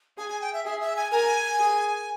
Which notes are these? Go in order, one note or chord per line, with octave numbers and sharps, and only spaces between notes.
G#4 G#5
G#5
G5
E5
G#4 E5
E5
G#5
A#4 G#5
G#4